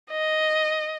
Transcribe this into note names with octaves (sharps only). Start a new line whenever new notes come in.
D#5